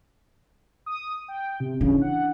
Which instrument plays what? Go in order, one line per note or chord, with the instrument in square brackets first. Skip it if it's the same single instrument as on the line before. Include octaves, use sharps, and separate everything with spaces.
[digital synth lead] D#6
G5
C3
[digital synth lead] C#3 [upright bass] E3 D4
[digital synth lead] F#5